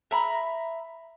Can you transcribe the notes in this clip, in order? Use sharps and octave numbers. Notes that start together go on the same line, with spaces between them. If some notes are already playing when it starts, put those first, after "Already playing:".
E5 A#5 B5